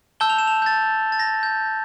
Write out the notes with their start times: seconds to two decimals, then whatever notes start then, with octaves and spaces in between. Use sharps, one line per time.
0.20 A5 E6 G6 G7
0.30 F7
0.38 E7
0.47 F7
0.62 G6
0.66 A6
1.12 A6
1.19 A#6
1.27 A6
1.43 G6